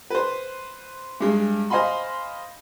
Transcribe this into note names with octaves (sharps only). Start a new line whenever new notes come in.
B4 C5
G2 G#3
C5 D#5 F5 G#5 B5 C6